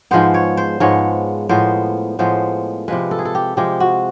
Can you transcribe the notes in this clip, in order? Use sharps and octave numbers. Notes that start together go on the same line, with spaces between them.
G#2 F3 G#3 B3 C5
C#5
C5
G#2 F3 G#3 B3 C#5
A2 F3 G#3 B3 C5
A2 F3 G#3 B3 C5
C3 F3 G#3 B4
A4
G#4
A4
G4
C3 F3 G#3 G4
F#4